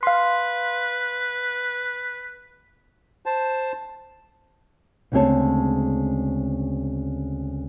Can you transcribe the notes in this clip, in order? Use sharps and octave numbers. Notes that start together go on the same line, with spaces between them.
B4 F5 C6
C5 A5
D2 C#3 G#3 C4 C#5 A5